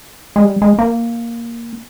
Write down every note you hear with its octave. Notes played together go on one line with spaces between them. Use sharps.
G#3
G3
G#3
A#3